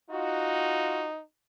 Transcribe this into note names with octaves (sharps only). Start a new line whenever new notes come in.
D#4 F4 F#4